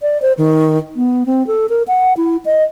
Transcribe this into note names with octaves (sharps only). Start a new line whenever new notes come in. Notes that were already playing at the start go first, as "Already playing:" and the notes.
D5
C5
D#3
B3
C4
A4
A#4
F#5
E4
D#5